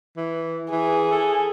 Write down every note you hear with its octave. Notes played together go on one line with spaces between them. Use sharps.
E3
E3 G#4
A4